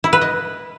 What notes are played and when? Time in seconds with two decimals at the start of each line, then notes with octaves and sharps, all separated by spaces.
0.04 E4
0.13 B4
0.21 D#5